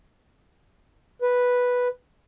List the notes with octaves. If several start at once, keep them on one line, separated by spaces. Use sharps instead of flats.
B4